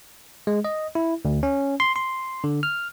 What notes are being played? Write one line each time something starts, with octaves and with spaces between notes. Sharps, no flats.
G#3
D#5
E4
D2
C#4
C6
C6
D3
F6